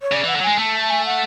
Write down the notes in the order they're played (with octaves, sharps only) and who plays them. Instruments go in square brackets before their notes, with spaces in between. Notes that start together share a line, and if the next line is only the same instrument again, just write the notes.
[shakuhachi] C#5
[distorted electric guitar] C#3 [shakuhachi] D5
[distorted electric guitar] E3 [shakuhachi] F#5
[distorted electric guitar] D3
F#3
[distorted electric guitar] G#3 [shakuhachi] G#5
[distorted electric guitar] A3 [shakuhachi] A5
[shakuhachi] A5
G#5
F#5